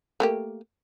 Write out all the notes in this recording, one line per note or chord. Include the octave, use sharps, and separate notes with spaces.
A3 A#3 G4